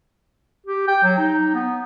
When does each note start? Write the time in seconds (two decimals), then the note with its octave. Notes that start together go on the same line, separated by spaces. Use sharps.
0.66 G4
0.88 G5
1.03 F#3
1.18 D#4
1.54 B3